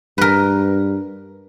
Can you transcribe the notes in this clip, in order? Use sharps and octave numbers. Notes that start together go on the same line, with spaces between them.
G2 A#4 B4